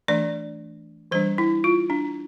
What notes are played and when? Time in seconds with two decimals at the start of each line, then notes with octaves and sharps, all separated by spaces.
0.08 E3 A3 D4 D5
1.11 E3 G3 D4 C5
1.38 E4
1.64 F4
1.90 D4